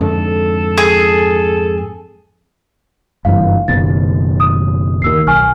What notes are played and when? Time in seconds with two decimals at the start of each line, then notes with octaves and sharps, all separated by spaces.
0.01 F2 G#2 D3 A4
0.78 G#4
3.25 F#1 G2 E3 F5
3.68 F#1 B2 D#3 A6
4.40 D#6
5.02 D#2 D#3 A#4 E6 C7
5.27 B1 G#5 C#6 F6